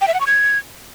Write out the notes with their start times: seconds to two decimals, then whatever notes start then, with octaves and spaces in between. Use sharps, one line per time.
0.01 G5
0.08 E5
0.14 F#5
0.20 C#6
0.27 G#6